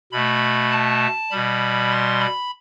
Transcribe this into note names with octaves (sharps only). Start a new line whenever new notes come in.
B2 A3 B5
A5
B2 G3 B5
C6
B5